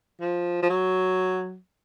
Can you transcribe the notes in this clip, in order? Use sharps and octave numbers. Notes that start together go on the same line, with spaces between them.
F3
F3
F#3